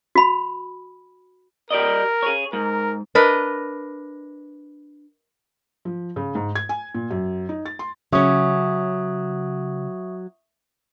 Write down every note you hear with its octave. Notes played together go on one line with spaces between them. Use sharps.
F#4 B5
G4 A#4 D5 D#5
G#4 C#5
G#2 A#4
D4 A#4 B4 D#5
F3
C#3
G#2
G#6
G#5
A#2
F#2
D#4
A6
C6
C#3 F#3 C#4 E5 C#6 D#6